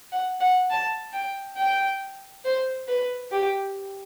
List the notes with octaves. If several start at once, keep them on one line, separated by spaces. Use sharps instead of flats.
F#5
F#5
A5
G5
G5
C5
B4
G4